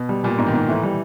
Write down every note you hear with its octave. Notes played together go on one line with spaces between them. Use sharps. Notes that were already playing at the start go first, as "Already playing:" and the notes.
Already playing: B2
G3
A#2 G3
G#2
D#3
G#2
A2 E3
G3